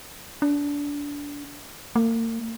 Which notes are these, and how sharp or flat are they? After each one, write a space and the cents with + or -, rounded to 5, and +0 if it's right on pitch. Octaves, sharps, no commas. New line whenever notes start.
D4 -25
A#3 -40